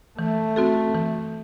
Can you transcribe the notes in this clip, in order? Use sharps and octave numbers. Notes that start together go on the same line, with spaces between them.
E3 A3
C4 F#4 A4
E3